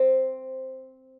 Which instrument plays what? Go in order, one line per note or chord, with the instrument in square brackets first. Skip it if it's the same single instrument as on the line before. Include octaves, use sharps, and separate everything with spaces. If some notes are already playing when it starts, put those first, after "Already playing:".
Already playing: [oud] C4